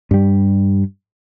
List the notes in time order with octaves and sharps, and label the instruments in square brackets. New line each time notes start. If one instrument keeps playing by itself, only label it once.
[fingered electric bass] G2 G3